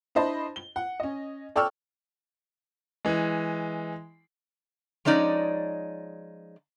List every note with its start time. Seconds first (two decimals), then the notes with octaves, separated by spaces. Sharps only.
0.15 D4 E4 C5 D#5 A5 B5
0.56 G7
0.76 F#5
1.00 C#4 D#5
1.56 A4 D5 G5 C#6 E6 F6
3.05 E3 G#3
5.05 F3 G#3 C#4 D#4 D5